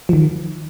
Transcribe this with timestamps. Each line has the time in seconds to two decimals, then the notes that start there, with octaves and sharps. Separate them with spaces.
0.09 F3
0.13 D#3